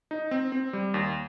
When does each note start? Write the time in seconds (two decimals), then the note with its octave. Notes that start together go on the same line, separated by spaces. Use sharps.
0.11 D#4
0.31 C4
0.52 C4
0.73 G3
0.94 D#2